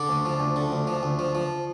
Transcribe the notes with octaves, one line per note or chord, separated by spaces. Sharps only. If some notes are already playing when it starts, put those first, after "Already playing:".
Already playing: D3 D5
D2
F3
D2
D3
D2
F3
D2
F3
F3